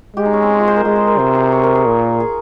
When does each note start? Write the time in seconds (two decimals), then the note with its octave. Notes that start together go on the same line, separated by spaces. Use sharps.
0.17 G#3 G4
0.25 D#4
0.33 C#4
0.43 C4
0.59 F4
0.68 C5
0.76 A#4
0.84 G#3 G#4
0.96 G#4
1.07 A#4
1.19 C3 C5
1.35 G#4
1.52 C#5
1.63 A#4
1.75 G#4
1.86 A#2
2.20 G#4